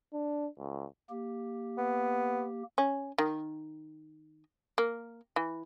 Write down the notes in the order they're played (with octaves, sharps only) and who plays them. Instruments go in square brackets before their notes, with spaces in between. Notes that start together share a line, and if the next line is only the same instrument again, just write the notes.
[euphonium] D4
C#2
[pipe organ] A#3 G4
[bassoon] B3
[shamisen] C#4
D#3
A#3
E3